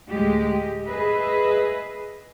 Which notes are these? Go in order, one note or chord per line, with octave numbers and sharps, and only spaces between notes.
D2 A2 G#3 G4
G#4 B4 D#5 E5